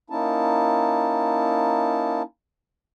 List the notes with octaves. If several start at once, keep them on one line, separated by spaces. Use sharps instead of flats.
A#3 C#4 D#4 E4 A5